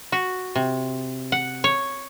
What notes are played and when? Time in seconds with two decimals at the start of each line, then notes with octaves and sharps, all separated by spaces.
0.12 F#4
0.55 C3
1.32 F#5
1.64 C#5